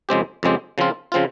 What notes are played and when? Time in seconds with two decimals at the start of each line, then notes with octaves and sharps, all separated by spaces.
0.09 F2 C#3 G#3 C4 G4
0.43 F2 C#3 G#3 C4 G4
0.78 C#3 F3 C4 F4
1.12 C#3 F3 C4 F4